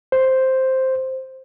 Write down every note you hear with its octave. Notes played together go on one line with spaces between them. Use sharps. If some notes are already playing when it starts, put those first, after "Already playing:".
C5